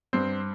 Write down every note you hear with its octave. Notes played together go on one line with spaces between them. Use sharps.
G2 C4